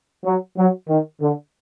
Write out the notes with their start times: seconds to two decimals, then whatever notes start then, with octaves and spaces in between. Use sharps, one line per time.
0.25 F#3
0.57 F#3
0.88 D#3
1.20 D3